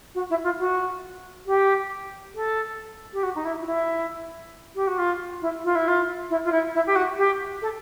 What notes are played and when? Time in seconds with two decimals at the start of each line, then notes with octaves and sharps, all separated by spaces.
0.14 F#4
0.30 E4
0.43 F4
0.59 F#4
1.46 G4
2.34 A4
3.13 G4
3.23 F#4
3.35 D#4
3.44 E4
3.62 F4
3.66 E4
4.75 G4
4.87 F#4
4.98 F4
5.41 E4
5.64 F4
5.75 E4
5.87 F4
6.30 E4
6.44 F4
6.51 E4
6.74 E4
6.86 G4
6.95 F#4
7.17 G4
7.61 A4